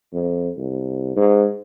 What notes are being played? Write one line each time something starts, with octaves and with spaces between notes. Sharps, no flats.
F2
C2
G#2